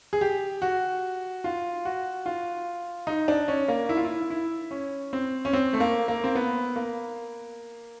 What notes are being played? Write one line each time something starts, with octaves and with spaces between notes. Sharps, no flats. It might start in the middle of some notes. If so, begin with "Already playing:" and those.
G#4
G4
F#4
F4
F#4
F4
D#4
D4
C#4
A#3
E4
F4
E4
E4
C#4
C4
C#4
C4
A3
A#3
A#3
C4
B3
A#3